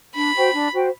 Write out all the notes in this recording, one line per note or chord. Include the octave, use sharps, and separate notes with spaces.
D4 B5
F#4 C5 G5
D4
F#4 C5 G5